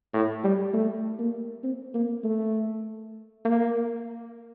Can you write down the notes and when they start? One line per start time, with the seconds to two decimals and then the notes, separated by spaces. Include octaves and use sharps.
0.13 A2
0.44 G3
0.74 A3
1.19 A#3
1.64 C4
1.94 A#3
2.24 A3
3.45 A#3